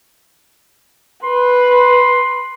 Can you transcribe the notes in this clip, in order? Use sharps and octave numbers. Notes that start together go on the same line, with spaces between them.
B4 C6